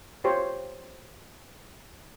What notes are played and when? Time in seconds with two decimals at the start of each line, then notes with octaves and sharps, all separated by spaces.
0.24 F4 G4 C5 C#5